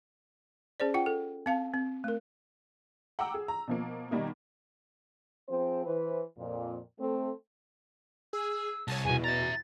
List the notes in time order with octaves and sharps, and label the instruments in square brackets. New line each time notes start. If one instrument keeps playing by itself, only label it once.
[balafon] C#4 G#4 C5 D5
F4 F#5 G5
A4
C4 F5 A5
C4
A3 A#4
[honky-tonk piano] F#5 G5 A#5 D6 E6
G#4
A#5
B2 F3 A#3
B2 D#3 G3 A#3 D#4
[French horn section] F3 C4 G#4 C5
E3 B4 C5
F2 A#2
A3 C4 A4
[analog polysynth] G#4 [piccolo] E6
[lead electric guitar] C2 [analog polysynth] C#5 G#5 A5
[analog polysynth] E2 B2 [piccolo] G#5
[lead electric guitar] E5 A#5 [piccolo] A6